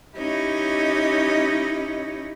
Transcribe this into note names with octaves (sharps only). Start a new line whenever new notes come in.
C#4 D#4 E4 G4 C#5 D#5